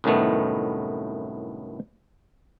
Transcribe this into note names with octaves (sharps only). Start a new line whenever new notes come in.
C2 F#2 A2 D#3 A3 B3